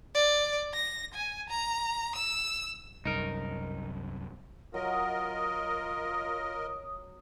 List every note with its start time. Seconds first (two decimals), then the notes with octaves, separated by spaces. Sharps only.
0.14 D5
0.74 A#6
1.14 G#5
1.49 A#5
2.16 E6
3.05 C2 F#2 D#4 A#4
4.74 F#3 F4 A#4 D#5 D#6